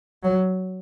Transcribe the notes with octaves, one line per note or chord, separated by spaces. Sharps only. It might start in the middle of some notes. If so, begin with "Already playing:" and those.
F#3